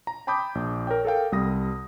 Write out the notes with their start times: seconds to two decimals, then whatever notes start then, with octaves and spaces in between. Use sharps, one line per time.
0.07 A#5
0.27 G5 A5 B5 D6 D#6 G6
0.55 A#1
0.87 A#4 C#5 G5
1.05 A4 A#4 F5 G5
1.32 C2 G3 D#6 A#6